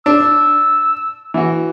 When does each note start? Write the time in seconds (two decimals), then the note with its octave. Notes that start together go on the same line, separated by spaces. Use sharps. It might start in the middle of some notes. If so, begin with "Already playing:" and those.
0.06 D4 E6
1.34 E3 F#4